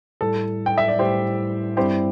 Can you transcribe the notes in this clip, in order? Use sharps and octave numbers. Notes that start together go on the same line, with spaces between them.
A2 G3 E4 A4
G5
E5
D5
A2 G3 E4 G4 C5
G2 G3 C4 E4 G4 C5